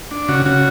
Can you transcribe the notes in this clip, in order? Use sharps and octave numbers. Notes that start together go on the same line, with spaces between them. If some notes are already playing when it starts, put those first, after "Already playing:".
D4
C#3 F#4
C#3 F#4